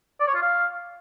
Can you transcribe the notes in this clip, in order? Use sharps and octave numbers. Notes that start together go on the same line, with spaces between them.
D5
C#5
F4
F5